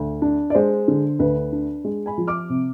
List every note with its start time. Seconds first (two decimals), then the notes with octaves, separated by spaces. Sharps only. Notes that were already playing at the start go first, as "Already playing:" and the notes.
Already playing: D2
0.22 D4
0.50 D5
0.55 G#3 C5
0.88 D3
1.19 D2 B4
1.52 D4
1.85 G#3
2.06 G#5 B5
2.18 F3
2.28 D6 F6
2.49 C3